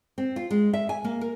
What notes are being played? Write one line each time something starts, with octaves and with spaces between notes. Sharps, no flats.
C4
F4
G#3
E5
G#5
A#3
A#4